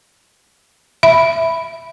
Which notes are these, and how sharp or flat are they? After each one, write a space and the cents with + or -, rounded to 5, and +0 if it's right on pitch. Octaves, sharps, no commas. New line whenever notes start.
E5 +5 B5 +0